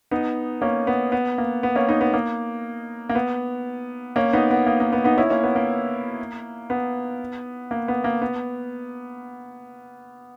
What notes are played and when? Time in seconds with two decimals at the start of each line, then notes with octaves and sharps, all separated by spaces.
0.11 B3 D#4
0.62 A#3 C#4
0.87 B3
1.12 B3
1.38 A#3
1.63 B3
1.75 A#3 C#4
1.89 B3 D#4
2.01 B3
2.13 A#3
3.09 A#3
3.15 B3
4.16 A#3 C#4
4.33 B3 D#4
4.51 B3
4.66 A#3
4.80 A#3
4.93 B3
5.04 B3 D#4
5.17 C#4 E4
5.30 A#3 C#4
5.43 B3
5.56 A#3
6.70 B3
7.71 A#3
7.88 B3
8.04 A#3
8.22 B3